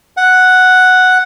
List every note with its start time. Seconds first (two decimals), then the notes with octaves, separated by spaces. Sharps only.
0.17 F#5